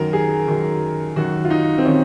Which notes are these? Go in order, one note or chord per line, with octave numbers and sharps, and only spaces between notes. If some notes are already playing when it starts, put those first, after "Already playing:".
Already playing: F#2 D#3 A#4
G#4
F#2 D#3
F#2 D#3 F#4
F4
D#4
C4
D#3 C#4